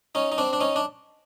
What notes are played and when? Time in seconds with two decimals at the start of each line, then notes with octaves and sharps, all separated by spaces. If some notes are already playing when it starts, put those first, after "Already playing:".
0.15 C#4 D#4
0.32 D#4
0.38 C4 D4
0.53 D4
0.61 C#4 D#4
0.76 D4